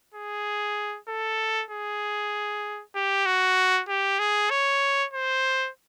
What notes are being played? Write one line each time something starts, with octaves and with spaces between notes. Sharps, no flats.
G#4
A4
G#4
G4
F#4
G4
G#4
C#5
C5